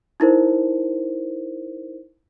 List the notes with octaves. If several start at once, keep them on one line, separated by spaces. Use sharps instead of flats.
D#4 E4 A#4 C5